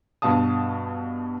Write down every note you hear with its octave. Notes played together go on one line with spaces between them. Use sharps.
G2 B2 F5 A5 D#6